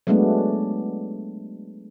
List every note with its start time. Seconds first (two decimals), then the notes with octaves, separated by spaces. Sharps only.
0.07 F#3 G#3 A3 B3 D4